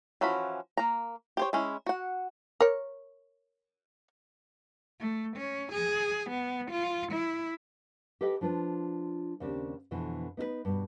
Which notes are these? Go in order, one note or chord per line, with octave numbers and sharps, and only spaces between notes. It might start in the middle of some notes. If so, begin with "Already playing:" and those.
E3 F3 C#4 F#4 B5
A#3 A#5
G4 C5 C#5
G#3 C#4 E4
F#4 F#5
A#4 C#5
A3
C#4
G#4
B3
F4
E4
G4 A4 B4 D#5 G5
F3 D4 F4 B4
D#2 C#3 C4 D4 G4
F2 B2 D3 E3
B3 D#4 A4 B4
G2 B2